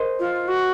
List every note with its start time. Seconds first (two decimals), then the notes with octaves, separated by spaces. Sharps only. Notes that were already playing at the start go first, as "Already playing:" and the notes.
Already playing: G#4 A#4 C5 D#5
0.20 F4
0.48 F#4